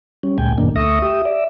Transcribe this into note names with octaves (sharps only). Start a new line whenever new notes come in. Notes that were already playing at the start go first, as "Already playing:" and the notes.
G3 C#4
D2 A#2 G#3 G5 G#5
F#2 A#2 D#3 A#3 D4
D2 A3 E5 C#6 D#6 A#6
G4 E5 D#6
D5 E5